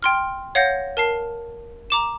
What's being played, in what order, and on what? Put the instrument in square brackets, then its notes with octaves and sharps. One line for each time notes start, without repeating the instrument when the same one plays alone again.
[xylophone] G5 C6 F6
C#5 F5 F#5 G6 A#6
A#4 A5 C7
A#5 D6 E7